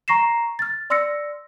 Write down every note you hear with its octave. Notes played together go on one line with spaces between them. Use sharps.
A#5 C#6 A#6 C7 E7
F6 A6
D5 C6 E6 F6 A#6 C#7